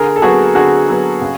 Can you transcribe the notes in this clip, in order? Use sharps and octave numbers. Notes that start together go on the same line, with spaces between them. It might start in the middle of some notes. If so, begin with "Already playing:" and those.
Already playing: D3 G#4 A#4
A4
F#3 B3 F#4 G#4
D3 F#4 G#4
F#3 B3
C#3